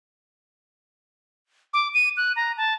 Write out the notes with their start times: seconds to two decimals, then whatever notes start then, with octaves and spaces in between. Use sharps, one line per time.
1.74 D6
1.94 D#7
2.17 F#6
2.36 A#5
2.57 A5